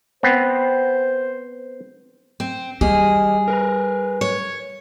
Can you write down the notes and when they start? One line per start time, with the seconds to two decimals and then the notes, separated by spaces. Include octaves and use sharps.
0.23 B3 C4 C5
2.40 C4
2.81 G3 G4 G#4 D#5
3.48 A#4 B4
4.21 C#5